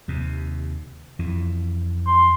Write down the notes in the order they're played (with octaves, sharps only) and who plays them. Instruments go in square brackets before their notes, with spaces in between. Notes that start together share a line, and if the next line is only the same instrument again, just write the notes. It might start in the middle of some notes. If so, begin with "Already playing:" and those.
[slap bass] D#2 C3
F2 E3
[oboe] C6